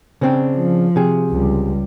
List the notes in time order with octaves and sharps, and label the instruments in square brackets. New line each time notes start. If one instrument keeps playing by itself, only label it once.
[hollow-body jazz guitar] C#3 C4 D4
[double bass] F3
[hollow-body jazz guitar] C3 G#4
[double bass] C#2 G3